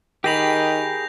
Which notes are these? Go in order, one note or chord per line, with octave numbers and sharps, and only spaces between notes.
D#3 G4 G#4 B5 G6 A#6 F7